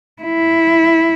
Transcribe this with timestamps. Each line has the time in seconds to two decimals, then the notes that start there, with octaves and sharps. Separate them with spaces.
0.22 E4